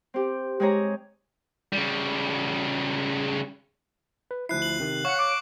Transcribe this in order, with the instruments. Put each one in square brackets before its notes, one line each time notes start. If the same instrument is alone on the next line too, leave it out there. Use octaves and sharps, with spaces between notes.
[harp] C4 G4
G#3 G4 G#4 C#5 A#5
[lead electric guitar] C#3 G3
[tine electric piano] B4
[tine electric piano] D2 F3 E4 [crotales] F#6 C7
[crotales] F#7
[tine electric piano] C3 D#3 F#6
[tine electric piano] C#5 F5 [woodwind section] F#5 [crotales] C#6
[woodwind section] D6